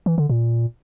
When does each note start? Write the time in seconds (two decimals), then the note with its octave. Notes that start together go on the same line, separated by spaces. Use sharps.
0.06 E3
0.18 D3
0.30 A#2